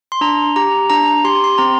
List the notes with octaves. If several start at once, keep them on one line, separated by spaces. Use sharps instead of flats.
C6
D4 A#5
G4 A#5
D4 A#5
G4 C6
C6
C4 A#5